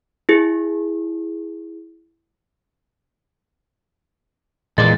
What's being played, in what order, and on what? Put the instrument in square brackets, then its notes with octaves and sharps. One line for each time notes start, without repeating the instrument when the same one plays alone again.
[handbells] E4 G#4
[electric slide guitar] E2 A#3 D5 [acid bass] A#2 [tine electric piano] E3 G#3 [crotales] A6